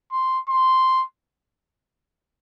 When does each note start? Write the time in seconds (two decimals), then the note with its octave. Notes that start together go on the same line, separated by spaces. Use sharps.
0.12 C6
0.49 C6